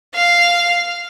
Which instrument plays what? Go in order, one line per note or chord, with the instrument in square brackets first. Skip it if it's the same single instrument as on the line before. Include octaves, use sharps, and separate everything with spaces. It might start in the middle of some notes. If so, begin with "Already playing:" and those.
[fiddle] F5